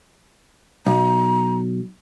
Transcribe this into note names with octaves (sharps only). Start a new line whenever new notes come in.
B1 A#5